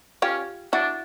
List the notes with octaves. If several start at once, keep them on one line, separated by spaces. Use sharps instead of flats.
C#4 F4 G4
D4 E4 F#4